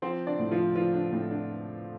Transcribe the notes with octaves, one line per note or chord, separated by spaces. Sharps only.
F3 C4 C5
D4 D5
A2
F3 F4
F3 F4
D4
A2 C4
D4